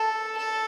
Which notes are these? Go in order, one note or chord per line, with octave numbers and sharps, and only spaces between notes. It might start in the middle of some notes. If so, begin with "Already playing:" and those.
Already playing: A4
A4